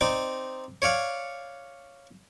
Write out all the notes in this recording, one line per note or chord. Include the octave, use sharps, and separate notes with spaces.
C4 D#4 D5
C#5 D5 F5 F#5